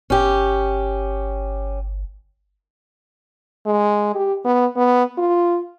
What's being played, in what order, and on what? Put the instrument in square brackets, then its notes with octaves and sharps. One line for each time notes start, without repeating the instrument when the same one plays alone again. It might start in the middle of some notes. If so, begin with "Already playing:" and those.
[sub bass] G1 [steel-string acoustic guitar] C#4 G4
[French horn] G#3
G4
B3
B3
F4